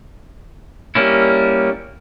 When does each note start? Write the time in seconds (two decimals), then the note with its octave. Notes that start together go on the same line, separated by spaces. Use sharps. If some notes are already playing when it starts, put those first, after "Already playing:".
0.95 G3 A#3 C#4 E4